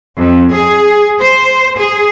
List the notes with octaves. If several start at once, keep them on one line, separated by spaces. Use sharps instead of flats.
F2
G#4
C5
G#4